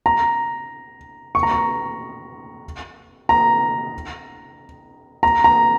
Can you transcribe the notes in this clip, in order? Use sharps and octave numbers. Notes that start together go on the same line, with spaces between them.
A#5
C#6
A#5
C#6
A#5
A#5
A#5